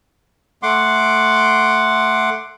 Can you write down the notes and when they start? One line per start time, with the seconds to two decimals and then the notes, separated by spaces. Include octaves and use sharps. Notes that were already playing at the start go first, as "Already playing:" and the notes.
0.63 A3 F#5 C6 D6